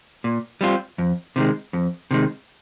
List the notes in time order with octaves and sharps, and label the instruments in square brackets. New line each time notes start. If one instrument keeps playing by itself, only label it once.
[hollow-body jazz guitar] A#2
G3 C4 F4
F2
C3 D#3 G#3
F2
C3 D#3 G#3